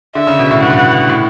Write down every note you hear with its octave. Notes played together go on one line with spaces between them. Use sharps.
D3 E5
C#3
B2
A2
G2 F#5
A2
G2
A2